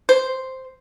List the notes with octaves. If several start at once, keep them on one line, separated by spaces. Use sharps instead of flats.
C5